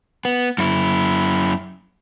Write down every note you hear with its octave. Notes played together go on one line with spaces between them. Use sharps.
B3
F#2 E4